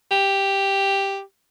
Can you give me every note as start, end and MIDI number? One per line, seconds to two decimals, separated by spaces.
0.11 1.21 67